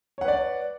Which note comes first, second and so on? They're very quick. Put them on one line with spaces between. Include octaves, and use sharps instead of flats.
C#5 F#5 B4 D5